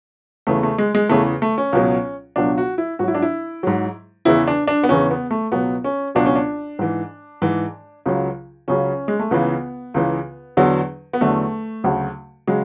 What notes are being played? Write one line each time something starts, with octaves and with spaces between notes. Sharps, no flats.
E2 C#3 E3 A3
A3
G#3
G#3
E2 C#3 E3 A3
A3
C#4
C#2 B2 F#3
C#2 B2 F#3 D4
F#4
E4
G#2 F#3 F#4
E4
D4
E4
G#2 F#3
E2 C#3 E3 E4
D4
D4
B3
E2 C#3 E3 C#4
B3
A3
C#2 B2 F#3 B3
C#4
C#2 B2 F#3 D4
C#4
D4
G#2 E3
G#2 E3
C#2 C#3 F#3
C#2 C#3 F#3 C#4
G#3
A3
C#2 C#3 E3 B3
C#2 C#3 E3
E2 D3 F#3
B3
E2 D3 F#3 A3
D2 C#3 F#3
C#3 F#3 G#3